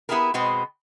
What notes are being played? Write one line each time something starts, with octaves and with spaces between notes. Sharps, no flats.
B3 E4 G4 G#4 A#4
B2 G#3 B3 C4